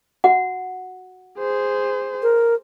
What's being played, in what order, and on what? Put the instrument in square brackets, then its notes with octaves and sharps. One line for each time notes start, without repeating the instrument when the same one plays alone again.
[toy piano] F#4 F#5
[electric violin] G#4 C5
[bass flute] A#4